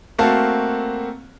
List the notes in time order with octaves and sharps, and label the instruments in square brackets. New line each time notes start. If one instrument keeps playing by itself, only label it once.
[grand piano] A3 A#3 C4 F#4 F5 A5